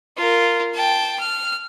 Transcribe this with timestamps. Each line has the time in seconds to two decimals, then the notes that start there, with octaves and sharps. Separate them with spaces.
0.17 F4 A#4
0.75 G5 A5
1.20 F6